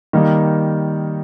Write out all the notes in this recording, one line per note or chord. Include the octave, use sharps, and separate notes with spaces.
D#3 G3 A#3 D#4